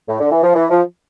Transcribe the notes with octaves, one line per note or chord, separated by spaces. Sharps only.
A2
D3
E3
F3
E3
F3